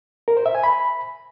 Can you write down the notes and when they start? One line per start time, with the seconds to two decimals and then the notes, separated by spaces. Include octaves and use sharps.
0.28 A#4
0.37 C5
0.46 E5
0.55 G#5
0.64 B5